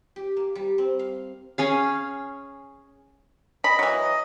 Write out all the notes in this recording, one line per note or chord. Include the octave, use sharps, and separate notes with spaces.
G4
A#3
G3
C4
F5
C#4 G#4 F5
D#5 B5
E3 F#3